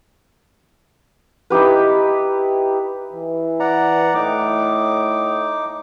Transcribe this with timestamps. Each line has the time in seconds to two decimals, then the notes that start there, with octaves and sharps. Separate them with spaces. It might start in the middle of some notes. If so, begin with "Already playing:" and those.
1.50 D#4 E4 G4 B4
3.13 E3
3.60 D5 F#5 A#5
4.15 A2 D#4 D6